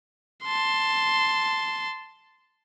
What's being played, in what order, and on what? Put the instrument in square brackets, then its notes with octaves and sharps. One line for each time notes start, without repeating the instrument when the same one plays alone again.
[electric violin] A5 C6